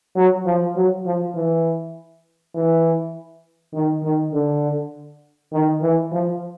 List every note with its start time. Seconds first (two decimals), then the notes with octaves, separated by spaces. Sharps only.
0.16 F#3
0.46 F3
0.76 F#3
1.05 F3
1.35 E3
2.54 E3
3.73 D#3
4.03 D#3
4.33 D3
5.52 D#3
5.82 E3
6.12 F3